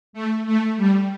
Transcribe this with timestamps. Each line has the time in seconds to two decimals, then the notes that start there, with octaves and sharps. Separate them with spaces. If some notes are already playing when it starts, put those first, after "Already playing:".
0.13 A3
0.46 A3
0.77 G3